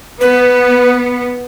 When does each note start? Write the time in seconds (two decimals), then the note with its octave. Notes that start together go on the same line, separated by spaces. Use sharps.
0.21 B3 B4